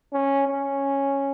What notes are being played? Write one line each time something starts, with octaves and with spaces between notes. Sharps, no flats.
C#4
C#4